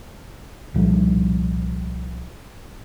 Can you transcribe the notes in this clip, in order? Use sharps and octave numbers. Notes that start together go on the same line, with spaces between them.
C2 A#2 F3 G3